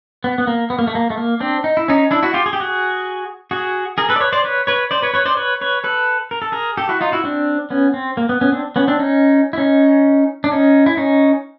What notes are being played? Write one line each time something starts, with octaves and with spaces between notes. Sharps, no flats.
B3
B3
A#3
B3
A#3
A3
A#3
A3
A#3
C4 D4
D#4
E4
C#4 D#4
D4 E4
E4 F#4
F4 G4
G#4
G4
F#4 G#4
F#4 G#4
G#4 A#4
A4 B4
D5
B4 C#5
C5 D5
B4 C#5
B4 C#5
C5 D5
B4 C#5
B4 C#5
C5 D5
B4 C#5
B4 C#5
A4 B4
A#4
A4
G#4 A#4
G4 A4
E4 F#4
D#4 F4
E4 F#4
C4 D4
B3 C#4
C4
A#3
B3
B3 C#4
C4 D4
B3 C#4
C4 D4
C#4 D#4
E4
C#4 D#4
D4
C#4 D#4
E4
C#4 D#4